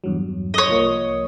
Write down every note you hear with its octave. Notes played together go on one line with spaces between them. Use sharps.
E2 G2 F#3
C#5 D#5
C2 F3 A#3